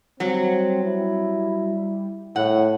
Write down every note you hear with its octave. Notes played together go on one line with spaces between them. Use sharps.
F#3 G3 C4
E4
A2 F#5